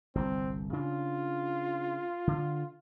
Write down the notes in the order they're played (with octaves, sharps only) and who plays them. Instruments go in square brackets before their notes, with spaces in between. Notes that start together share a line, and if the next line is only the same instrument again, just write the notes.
[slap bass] G1 C2 [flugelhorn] C4
[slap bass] C#3 D4 [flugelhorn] F4
[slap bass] D3